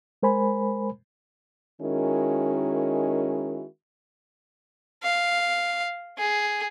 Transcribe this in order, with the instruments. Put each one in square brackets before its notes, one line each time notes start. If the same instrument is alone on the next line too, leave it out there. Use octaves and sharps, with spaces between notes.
[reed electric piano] G#3 A#4 C5 G#5 B5
[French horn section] D#3 G#3 C#4 E4 F#4 A#4
[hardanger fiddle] F5
G#4